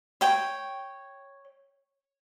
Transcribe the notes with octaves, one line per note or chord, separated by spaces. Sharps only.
C#5 G5